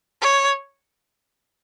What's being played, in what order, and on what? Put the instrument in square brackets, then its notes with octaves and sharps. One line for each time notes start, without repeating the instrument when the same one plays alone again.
[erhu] C#5